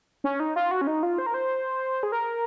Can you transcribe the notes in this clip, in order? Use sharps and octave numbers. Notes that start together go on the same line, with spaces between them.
C#4
D#4
F4
F#4
C#4
D#4
F4
C5
A#4
C5
G#4
A#4